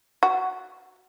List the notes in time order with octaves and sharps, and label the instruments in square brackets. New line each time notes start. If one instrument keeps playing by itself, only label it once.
[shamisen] F#4